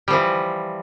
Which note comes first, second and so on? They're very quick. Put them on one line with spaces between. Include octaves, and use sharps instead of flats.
G3 F3 E3